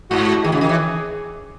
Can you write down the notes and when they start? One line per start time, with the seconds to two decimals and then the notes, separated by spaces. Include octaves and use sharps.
0.10 G#2 F#4
0.27 F#4
0.44 D#3 G#4
0.52 C#3
0.61 D#3
0.69 E3